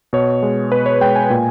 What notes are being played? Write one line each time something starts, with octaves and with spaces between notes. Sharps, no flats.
B2 C#5
G#3
B2 B4
C#5
G#3 G5
G#5
A#2